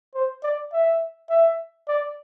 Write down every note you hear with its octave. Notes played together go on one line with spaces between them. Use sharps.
C5
D5
E5
E5
D5